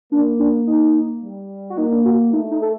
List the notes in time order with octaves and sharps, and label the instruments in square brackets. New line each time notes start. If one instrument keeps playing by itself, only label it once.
[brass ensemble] A#3 [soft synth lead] D4
[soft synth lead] D4
D#4
[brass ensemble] G3
[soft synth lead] F#4
[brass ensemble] A#3 [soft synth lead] D#4
[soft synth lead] D4
F#4
[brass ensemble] A3 [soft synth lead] D#4
[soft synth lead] D#4
A4